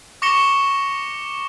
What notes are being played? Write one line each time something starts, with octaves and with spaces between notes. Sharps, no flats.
C#6 D6 A#6 C#7 E7 G7